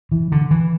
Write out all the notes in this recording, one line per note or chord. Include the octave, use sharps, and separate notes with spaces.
E3
D3
E3